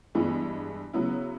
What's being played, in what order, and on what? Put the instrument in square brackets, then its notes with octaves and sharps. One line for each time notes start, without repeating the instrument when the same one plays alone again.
[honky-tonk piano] G2 E3 G#3 B3 E4
C#3 F#3 B3 E4